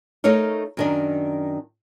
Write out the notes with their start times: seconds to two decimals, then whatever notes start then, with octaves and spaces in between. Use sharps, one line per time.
0.24 A3 D#4 A#4 C#5 F5
0.77 F#2 D#3 D4